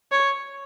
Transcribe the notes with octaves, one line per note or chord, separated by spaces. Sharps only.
C#5